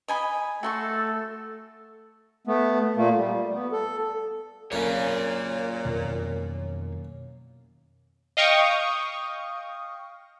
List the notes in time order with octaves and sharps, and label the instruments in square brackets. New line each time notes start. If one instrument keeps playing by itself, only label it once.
[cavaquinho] D#5 G#5 B5
[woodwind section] A3 A4 [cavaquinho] F#4 C6 C#6
[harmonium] A3 B3
A#2 A3 A#3
G3
B3
A4
[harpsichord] F#2 A#3 [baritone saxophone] A#2 [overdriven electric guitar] C#5 F5
[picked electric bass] F2 B2 D#3
[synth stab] D#5 F5 G5 C#6 D#6